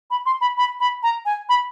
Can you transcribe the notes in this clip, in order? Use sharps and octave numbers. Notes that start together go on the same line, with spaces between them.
B5
C6
B5
B5
B5
A#5
G#5
B5